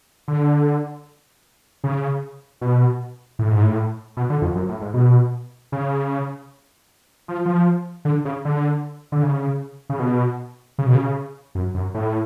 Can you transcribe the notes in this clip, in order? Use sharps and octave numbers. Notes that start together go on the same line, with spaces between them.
D3
C#3
B2
A2
G#2
A2
B2
D3
F2
F#2
A2
G#2
B2
C#3
F3
F3
D3
C#3
D3
D3
C#3
C#3
B2
C#3
B2
C#3
F#2
F#2
A2